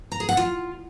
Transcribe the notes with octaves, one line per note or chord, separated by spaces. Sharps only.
A#5
G#4
F#5
F4